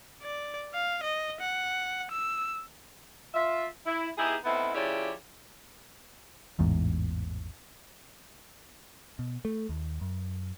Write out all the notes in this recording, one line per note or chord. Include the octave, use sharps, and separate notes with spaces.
D5
F5
D#5
F#5
E6
F4 E5
E4
B3 D#4 E4 G4 G#4
A2 B3 C4 D#4 E4
C#3 F3 E4 G4 C#5 D5
A1 E2 G#2
B2
A3
D#2
F#2